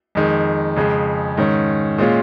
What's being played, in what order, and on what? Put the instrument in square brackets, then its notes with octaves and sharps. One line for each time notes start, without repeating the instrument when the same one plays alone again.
[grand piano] F2 D#3 G#3
F2 C#3 G#3
G#2 D#3 C#4
A#2 G#3 C#4 F4